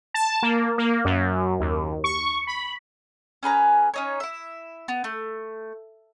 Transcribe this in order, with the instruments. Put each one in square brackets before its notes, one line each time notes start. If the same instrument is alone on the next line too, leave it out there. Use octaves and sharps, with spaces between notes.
[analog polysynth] A5
A#3
A#3
F#2
D#2
C#6
B5
[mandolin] C#4 G#4 B4 A#5
C#4 D#4 C#5
E4 E5
B3
A3